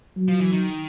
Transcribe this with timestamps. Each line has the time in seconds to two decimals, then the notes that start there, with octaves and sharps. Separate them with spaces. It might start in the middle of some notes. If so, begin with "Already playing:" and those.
0.16 F#3
0.28 F3
0.41 E3
0.52 D#3